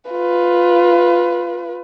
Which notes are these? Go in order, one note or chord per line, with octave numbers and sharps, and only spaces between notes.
F4 B4